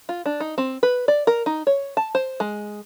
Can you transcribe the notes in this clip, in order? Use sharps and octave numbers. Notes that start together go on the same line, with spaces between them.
F4
D4
D#4
C4
B4
D5
A#4
D#4
C#5
A5
C5
G#3